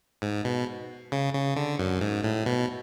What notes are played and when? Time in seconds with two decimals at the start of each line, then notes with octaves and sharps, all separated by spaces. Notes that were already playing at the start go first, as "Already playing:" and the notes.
0.22 G#2
0.45 B2
1.12 C#3
1.34 C#3
1.56 D3
1.79 F#2
2.01 G#2
2.24 A2
2.46 B2